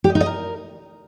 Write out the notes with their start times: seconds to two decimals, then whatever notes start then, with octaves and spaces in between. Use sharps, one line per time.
0.04 G4
0.10 D#5
0.15 D#4
0.21 D#5
0.26 A#4